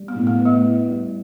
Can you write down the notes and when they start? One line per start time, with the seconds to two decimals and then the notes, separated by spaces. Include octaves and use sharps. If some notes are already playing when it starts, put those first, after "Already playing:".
Already playing: G3
0.08 B3
0.15 A2
0.27 B3
0.39 B3
0.45 A3
0.62 E4
0.87 G3